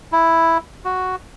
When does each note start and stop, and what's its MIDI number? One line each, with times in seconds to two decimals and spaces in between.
0.12 0.58 64
0.85 1.16 66